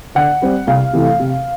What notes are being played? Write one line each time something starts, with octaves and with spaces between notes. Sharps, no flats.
D3 F#5
G3 C4
C2 F5
C3 E3 A3
C3